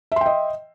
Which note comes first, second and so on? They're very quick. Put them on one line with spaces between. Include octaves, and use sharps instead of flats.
E5 C6 G5 D#5